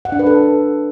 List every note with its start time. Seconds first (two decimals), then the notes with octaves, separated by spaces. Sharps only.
0.05 F#5
0.12 D4
0.19 B4
0.26 A4